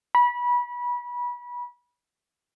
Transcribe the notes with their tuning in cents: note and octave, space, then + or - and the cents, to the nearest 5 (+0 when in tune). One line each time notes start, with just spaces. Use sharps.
B5 -25